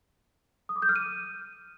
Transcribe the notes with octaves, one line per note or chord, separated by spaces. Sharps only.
D#6
D6
G6
F6
D#7